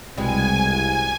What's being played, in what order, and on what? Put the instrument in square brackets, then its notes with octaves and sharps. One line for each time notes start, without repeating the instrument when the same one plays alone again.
[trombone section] C2 [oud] B2 G3 G#3 [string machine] G#5